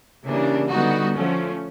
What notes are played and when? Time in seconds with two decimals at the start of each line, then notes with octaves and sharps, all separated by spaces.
0.25 C#3 E3 G3 A#3 D4
0.69 D3 G3 B3 D#4 F#4
1.14 F3 A3 C#4